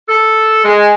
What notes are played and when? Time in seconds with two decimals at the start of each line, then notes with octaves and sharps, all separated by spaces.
0.09 A4
0.65 G#3